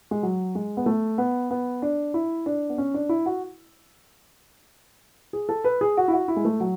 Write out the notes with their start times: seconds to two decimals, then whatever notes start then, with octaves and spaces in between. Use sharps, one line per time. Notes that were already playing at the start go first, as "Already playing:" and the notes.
0.11 G#3
0.23 F#3
0.55 G#3
0.77 B3
0.86 A3
1.18 B3
1.51 B3
1.82 D4
2.14 E4
2.46 D4
2.69 B3
2.78 C#4
2.94 D4
3.09 E4
3.26 F#4
5.33 G#4
5.49 A4
5.64 B4
5.81 G#4
5.97 F#4
6.08 E4
6.13 F#4
6.28 E4
6.36 G#3
6.45 A3
6.60 F#3